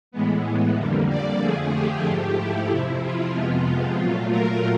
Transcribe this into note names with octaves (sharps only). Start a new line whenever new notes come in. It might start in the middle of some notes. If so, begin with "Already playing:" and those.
A2 E3 G#3 B3
F2 D3 G3 A#3
D5
F2 D3 F3 A3 G#4
G4
G#2 F3 A3
E4
F2 C3 F3
F4
F2 C3 F3 G#3 B3
F4
A#2 F#3 A3
A#4